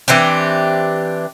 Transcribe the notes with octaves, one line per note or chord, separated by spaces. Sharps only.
E3 C4 D4 G4